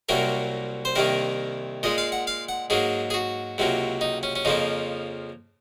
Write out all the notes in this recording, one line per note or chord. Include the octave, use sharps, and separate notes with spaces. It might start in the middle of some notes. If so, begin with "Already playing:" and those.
C2 C3 F#3 A#3 A#4
C5
C2 C3 D#3 A#3 A#4
A#2 G#3 D#5
F5
F#5
F5
F#5
G#2 F#3 A#3 G#4
G#4
F#4
C#2 C3 F#3 A#3
D#4
C#4
C#4
F2 C#3 F3 A#3 D#4